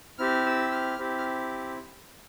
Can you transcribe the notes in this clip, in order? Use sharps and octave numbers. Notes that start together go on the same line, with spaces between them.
C4 E4 G4 F6
E6
F6
C4 E4 G4
F6